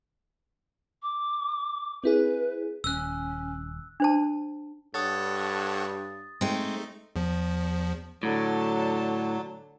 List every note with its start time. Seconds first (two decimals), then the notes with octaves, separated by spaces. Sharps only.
1.03 D6
2.04 C4 E4 G#4 B4
2.84 D#1 C#4 E6 F#6
4.00 D4 C5 A5
4.94 G2 A4 C#5 F#5 D#6 A6
6.41 G#3 A3 C4 D#4
7.16 E2 F3
8.23 A2 D3 F#3 A5